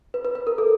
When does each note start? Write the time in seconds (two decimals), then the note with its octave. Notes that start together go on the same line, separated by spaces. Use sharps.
0.14 B4
0.25 B4
0.35 B4
0.47 A#4
0.58 A4